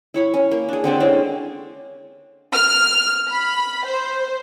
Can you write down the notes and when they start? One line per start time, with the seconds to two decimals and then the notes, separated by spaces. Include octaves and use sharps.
0.14 E4 C#5 B5
0.34 C#4
0.51 A#3
0.69 D4 G#4
0.84 D3 C4 D4 G4
1.00 G#3 C4 C#4 E4
2.54 F6
3.29 B5
3.85 C5